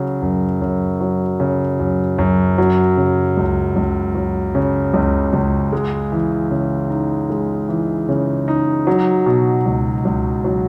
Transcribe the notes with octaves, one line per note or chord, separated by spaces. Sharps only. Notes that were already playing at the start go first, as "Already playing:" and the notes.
Already playing: C#3 F#3
F#2
F#2
F#3
C#3
F#2
F#2
F#3
C#3
C#2
C#2
F#3
C#3
C#2
C#2
G#3
E3
C#3
D#4
G#3
E3
C#3
D#4
F#3
B2
C#2
C#2
F#3